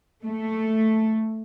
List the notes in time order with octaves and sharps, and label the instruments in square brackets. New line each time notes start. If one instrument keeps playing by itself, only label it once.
[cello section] A3